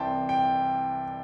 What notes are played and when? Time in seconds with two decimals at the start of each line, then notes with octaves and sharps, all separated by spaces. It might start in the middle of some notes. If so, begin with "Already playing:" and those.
Already playing: C2 C3 E3 G5 A5 C6
0.29 G5